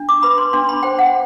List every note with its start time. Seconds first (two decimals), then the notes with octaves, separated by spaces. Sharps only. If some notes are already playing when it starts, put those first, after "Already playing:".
Already playing: D4
0.09 D6
0.23 B4 B5
0.38 C6
0.53 D4 C6
0.69 B5
0.83 C5 G5
0.99 F#5